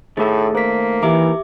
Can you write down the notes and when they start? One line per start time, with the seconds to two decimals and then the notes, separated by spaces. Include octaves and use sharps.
0.17 A2 D#3 A3 G#4 A4 E5
0.55 A#3 C5 B6
1.03 D#2 E3 G4 A#4 E5 D6